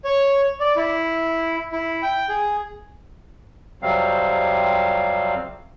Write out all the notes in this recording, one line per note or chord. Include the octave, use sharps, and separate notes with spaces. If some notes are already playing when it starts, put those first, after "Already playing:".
C#5
D5
E4
E4
G5
G#4
F2 C3 F#3 G3 C4 F5